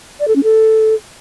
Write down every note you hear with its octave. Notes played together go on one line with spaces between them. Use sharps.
D5
A4
C#4
A4